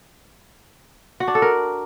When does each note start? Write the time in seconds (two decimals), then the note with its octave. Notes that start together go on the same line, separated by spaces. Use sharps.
1.20 F#4
1.28 D4
1.35 A4
1.42 A#4